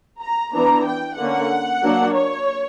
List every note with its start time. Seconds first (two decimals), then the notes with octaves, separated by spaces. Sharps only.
0.22 A#5
0.54 E3 B3 D4 A#5
0.86 G5
1.18 D3 A#3 C#4 F#5
1.82 F#3 A#3 D4
2.15 C#5